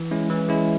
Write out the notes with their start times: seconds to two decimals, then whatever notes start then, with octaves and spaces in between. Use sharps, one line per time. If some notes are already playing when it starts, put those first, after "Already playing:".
Already playing: E3
0.11 G#3 C#4 E4
0.30 E3
0.49 G#3 C#4 E4